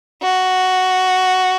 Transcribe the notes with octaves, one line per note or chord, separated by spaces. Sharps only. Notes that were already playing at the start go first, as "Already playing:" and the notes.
F#4